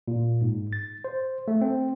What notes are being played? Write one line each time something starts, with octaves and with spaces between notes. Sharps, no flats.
A#2
G#2
A6
C5
A3
C4